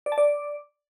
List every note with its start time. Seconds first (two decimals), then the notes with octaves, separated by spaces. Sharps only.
0.06 D5
0.12 A5
0.18 D5